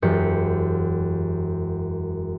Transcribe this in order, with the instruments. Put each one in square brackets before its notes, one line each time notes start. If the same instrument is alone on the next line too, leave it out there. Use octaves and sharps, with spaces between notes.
[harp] E1 F#2 G4 C#7